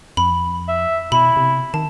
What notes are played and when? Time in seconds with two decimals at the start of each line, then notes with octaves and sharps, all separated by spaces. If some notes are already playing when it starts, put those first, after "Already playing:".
0.17 F2 B5
0.68 E5
1.12 B2 E4 B5
1.37 C3
1.74 D#3 A5